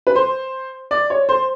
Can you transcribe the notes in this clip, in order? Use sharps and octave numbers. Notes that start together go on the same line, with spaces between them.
B4
C5
D5
C#5
C5